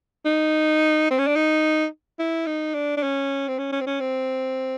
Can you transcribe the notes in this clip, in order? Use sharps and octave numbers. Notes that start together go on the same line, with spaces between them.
D#4
C4
C#4
D4
D#4
E4
D#4
D4
D4
C#4
C4
C#4
C#4
C4
C#4
C4